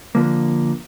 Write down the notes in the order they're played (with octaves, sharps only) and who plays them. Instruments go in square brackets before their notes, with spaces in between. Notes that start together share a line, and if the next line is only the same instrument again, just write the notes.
[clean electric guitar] D3 F3 A#3